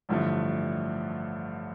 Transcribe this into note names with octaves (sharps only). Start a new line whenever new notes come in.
A1 G2 D3 F3 A3